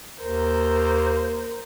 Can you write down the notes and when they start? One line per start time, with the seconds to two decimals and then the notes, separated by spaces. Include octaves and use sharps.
0.21 D#2 A#4 C5